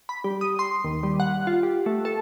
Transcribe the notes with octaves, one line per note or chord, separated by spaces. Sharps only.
B5
G3
D#6
C6
D#2
G3
F#5
F4
G4
A3
A4